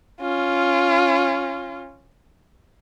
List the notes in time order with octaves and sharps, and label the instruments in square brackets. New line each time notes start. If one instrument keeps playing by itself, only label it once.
[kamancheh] C#4 F4